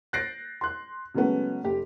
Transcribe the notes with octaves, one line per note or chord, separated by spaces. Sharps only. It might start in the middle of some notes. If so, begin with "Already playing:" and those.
F#6 G6 A6 A#6 C7 D7
C6 F#6
C#3 F#3 G#3 A3 B3 C#4
F1 G4